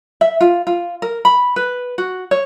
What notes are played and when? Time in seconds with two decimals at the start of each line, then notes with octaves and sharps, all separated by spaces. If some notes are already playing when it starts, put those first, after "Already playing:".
0.21 E5
0.41 F4
0.67 F4
1.02 A#4
1.25 B5
1.56 B4
1.98 F#4
2.31 C#5